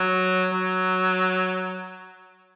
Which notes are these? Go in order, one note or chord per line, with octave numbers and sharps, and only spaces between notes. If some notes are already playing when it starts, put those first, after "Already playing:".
Already playing: F#3
F#3